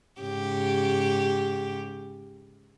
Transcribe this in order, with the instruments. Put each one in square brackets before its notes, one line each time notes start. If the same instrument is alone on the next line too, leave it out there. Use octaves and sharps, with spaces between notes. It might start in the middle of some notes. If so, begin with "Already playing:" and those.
[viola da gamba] G#2 C#3 G4